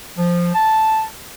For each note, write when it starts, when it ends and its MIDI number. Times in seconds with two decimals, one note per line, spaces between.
0.17 0.50 53
0.55 1.04 81